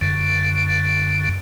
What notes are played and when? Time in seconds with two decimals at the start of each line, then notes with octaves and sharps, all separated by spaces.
0.01 F#2 D3